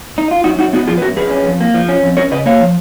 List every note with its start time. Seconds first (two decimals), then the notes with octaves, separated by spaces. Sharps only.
0.18 D#4
0.31 F4
0.44 F#2 D#4 F#4
0.59 F#2 D#4 F#4
0.73 B3 D#4 F#4
0.87 F3 F4 G#4
0.98 B4
1.02 F#2 F#4 A#4
1.16 F#2 G#4 B4
1.30 C#4
1.45 F2
1.60 A#3
1.74 F3
1.89 C#4
2.03 F2
2.17 C#4 A#4 C#5
2.31 C#3 B4 D#5
2.46 A#3 C#5 F5
2.60 F3